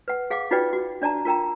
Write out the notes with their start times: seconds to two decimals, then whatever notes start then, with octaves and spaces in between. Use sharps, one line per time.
0.08 B4 F#5
0.30 G#4 F5 F#5 D6
0.51 D#4 F4 F#4 B4 D5 G5
0.73 F#4
1.02 D4 D5 A5 A#5
1.25 F4 A#4 G5 A#5